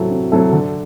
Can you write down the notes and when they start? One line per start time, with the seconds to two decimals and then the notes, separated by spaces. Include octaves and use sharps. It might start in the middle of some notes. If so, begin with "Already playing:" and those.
Already playing: C3 F#3 C4 E4 A4
0.11 C3
0.32 F#3 C4 E4 A4
0.53 D3